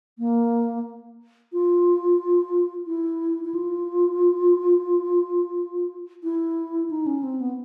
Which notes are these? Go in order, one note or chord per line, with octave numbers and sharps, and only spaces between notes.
A#3
F4
E4
E4
F4
E4
D#4
C#4
C4
B3